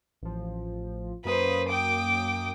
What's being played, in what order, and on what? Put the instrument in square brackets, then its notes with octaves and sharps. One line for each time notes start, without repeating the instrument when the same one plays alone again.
[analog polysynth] A1 F3
[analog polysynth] F#2 A#3 D#6 [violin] B4 C5
[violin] G5 D6